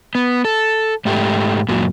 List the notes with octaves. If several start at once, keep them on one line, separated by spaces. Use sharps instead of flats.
B3
A4
G#2 A3 G4
F#2 A#2 F#3